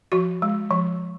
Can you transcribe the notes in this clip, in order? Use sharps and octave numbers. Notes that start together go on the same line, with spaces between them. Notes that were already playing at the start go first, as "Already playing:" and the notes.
F3 F#4
G#3
F3